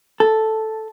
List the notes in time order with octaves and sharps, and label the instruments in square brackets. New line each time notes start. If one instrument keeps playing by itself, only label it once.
[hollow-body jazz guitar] A4